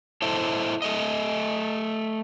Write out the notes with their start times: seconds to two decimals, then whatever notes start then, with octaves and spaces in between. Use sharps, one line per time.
0.22 E4 A4 C5 D#5 E5
0.82 A3 D#5